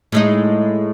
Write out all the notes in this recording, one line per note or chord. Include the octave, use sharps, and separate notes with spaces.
A2 G#3 D#4